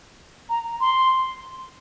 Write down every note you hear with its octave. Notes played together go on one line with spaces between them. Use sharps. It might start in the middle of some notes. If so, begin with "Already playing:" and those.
A#5
C6